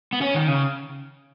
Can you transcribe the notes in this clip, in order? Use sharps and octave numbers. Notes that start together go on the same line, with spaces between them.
B3
C#4
D#3
C#3